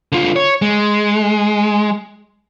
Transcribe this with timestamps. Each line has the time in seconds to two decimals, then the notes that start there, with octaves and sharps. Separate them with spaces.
0.12 D3 F4
0.36 C#5
0.62 G#3